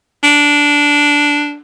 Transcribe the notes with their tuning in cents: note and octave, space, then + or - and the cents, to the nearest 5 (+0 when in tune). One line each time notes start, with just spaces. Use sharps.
D4 -10